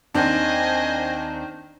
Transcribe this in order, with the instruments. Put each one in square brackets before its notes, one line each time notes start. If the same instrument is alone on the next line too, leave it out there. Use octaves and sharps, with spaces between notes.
[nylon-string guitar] D#2 C4 [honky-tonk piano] D#3 D4 [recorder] C5 [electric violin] D#5 G#5